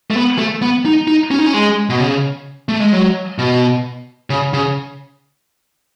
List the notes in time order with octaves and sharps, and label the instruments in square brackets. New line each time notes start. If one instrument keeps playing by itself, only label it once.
[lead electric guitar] A3
B3
A3
B3
D#4
D#4
C#4
D#4
C#4
G#3
B2
C#3
A3
G#3
F#3
B2
C#3
C#3